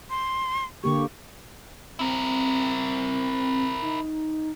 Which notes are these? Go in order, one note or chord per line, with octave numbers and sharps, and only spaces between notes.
C6
D3 A#3 G4 C#6
C4 E4 A#4
D#4